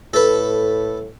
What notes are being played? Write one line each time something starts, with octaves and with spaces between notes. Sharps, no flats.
A2 A4 B4